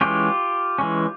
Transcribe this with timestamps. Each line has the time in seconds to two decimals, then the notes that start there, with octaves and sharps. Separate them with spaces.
0.01 E3 G#3 C#4 F4 G4
0.78 E3 G#3 C#4